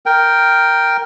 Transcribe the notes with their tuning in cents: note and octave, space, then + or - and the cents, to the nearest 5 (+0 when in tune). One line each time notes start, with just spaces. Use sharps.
A#4 +0 G5 +0